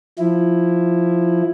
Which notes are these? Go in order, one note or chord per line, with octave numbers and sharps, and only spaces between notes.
F3 E4